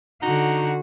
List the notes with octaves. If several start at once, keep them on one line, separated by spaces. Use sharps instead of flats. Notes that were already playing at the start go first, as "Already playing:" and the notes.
D3 D#4 F#4